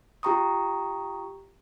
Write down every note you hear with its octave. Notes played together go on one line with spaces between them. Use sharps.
F4 G4 G5 A#5 C#6 D#6